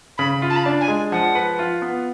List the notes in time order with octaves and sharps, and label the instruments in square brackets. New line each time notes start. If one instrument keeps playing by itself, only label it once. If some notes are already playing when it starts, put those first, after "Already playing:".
[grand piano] C#3 [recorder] B5
[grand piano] F4
[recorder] A5
B5
[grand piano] D4 [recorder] A5
[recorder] G#5
[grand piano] G#3
[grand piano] F3 [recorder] F#5
[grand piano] B4
F4
B3